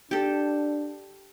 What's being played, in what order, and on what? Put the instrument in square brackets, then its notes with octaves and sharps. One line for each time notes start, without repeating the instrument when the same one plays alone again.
[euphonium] D4 [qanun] G4 A4